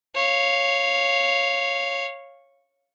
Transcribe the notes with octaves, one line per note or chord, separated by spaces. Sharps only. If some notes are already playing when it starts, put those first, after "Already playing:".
C#5 F5